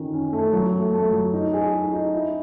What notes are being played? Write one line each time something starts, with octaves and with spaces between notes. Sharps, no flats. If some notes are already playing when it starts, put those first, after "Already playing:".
Already playing: D#3 C#4
C#4
A3
F#3
A3
A3
F#3
D#4
G#4
D#4
D#4
E4